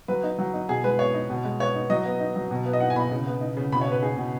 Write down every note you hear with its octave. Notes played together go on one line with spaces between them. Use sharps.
F#3 B4
D#4
F#3
D#4
B2 G#4
G#3 B4
B3 C#5
D#4
B2
G#3
B3 C#5
D#4
F#3 D#5
B3
D#4
F#3
B2
B3
D#5
D#4 F#5
G#5
B2 B5
C#3
B3
D#4
C#3
B2 B5
C#5
B3 B4
D#4 G#4
B2